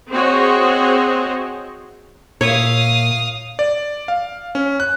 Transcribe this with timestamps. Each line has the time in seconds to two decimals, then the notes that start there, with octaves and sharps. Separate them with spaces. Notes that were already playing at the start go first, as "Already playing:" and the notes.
0.11 C4 F#4 G#4 C5 C#5 D#5
2.41 A#2 C#5 E5 F5 D#6
3.59 D5
4.08 F5
4.55 C#4
4.80 F#6